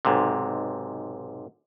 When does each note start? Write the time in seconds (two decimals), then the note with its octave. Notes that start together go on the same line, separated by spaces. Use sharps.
0.05 B1 G#2 C3